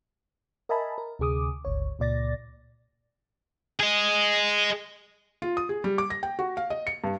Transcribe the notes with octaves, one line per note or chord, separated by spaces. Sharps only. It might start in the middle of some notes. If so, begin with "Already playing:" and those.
A#4 D#5 E5 G#5 A5 B5
A#4
D2 C3 G#4 D6 D#6
G1 C#2 C#5
C#2 A#2 D5 A6 A#6
G#4 D#5
F4
D#6
G#4
G3
D6
A#6
G5
F#4
F5
D#5
C#7
G2